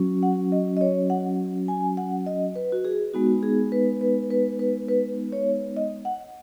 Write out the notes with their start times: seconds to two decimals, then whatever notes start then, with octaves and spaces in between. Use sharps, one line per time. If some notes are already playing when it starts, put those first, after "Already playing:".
Already playing: F#3 C#4 F#4
0.23 F#5
0.52 D#5
0.77 D#5
0.81 C#5
1.10 F#5
1.68 G#5
1.97 F#5
2.26 D#5
2.56 B4
2.72 F#4
2.85 G#4
3.14 G#3 B3 D#4 F#4
3.43 G#4
3.72 B4
4.01 B4
4.30 B4
4.59 B4
4.88 B4
5.32 C#5
5.77 D#5
6.05 F#5